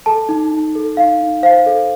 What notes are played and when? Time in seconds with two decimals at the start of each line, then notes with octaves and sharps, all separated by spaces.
0.06 A4 A5
0.29 D#4
0.52 D#4
0.75 A4
0.97 D#4 F5
1.21 D#4
1.43 C5 F5
1.66 A4